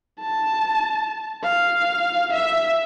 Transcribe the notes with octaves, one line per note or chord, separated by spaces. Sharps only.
A5
F5
E5